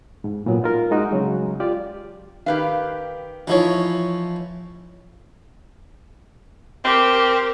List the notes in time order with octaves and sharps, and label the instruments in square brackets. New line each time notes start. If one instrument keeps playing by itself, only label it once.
[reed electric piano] G#2
A#2 F#3 B3
D#4 F4 A#4
G#3 D#4 F#4
C#3 F#3 G#3
F4 G4 D5
[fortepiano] D#3 [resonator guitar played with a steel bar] G4 B4 F5
[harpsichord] E3 F3 C#5 [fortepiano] D#4 E4
[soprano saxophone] C4 [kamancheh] G4 A#4